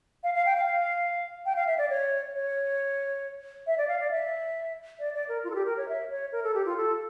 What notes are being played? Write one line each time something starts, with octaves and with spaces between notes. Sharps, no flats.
F5
F5
G5
F5
G5
F5
E5
D5
C#5
C#5
E5
D5
F5
D5
E5
D5
D5
A#4
F4
A4
G4
A#4
C#5
E5
C#5
A#4
A4
G4
F4
A4